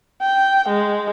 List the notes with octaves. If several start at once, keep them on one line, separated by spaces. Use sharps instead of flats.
G5
G#3